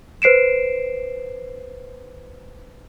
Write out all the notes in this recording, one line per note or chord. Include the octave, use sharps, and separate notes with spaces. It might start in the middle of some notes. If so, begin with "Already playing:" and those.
B4 C5 C7 D7 E7